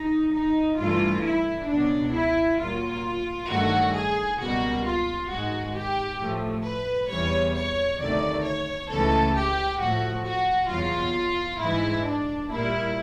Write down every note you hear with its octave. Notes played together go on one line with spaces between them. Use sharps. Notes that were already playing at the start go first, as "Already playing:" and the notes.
Already playing: D#4
D#4
G2 E3 A3 F4
E4
C#2 B2 F#3 D4
E4
A#2 F#3 A#3 F4
G2 D#3 F#3 A3 F#4
G#4
C#2 B2 G3 A#3 F#4
F4
G#2 D#3 G#3 F#4
G4
A2 F3 A3
B4
E2 C3 E3 G3 C#5
C#5
D2 C3 D#3 F#3 A3 D5
C#5
C#2 C#3 E3 A3 A4
G4
A2 F3 A3 F#4
F#4
E2 B2 F#3 F4
G#2 E3 G#3 E4
D4
A#2 G3 A#3 E4